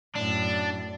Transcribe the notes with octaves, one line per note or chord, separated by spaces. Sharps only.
F#2 A2 D4